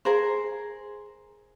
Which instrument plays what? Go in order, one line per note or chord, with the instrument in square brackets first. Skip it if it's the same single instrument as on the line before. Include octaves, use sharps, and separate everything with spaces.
[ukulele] G#4 A#4 C5